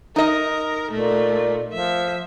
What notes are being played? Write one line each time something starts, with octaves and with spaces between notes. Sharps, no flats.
D#4 A#4 D#5
A#2 A3
F3 E5